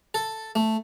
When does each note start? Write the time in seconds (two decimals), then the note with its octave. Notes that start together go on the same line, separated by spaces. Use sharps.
0.14 A4
0.55 A3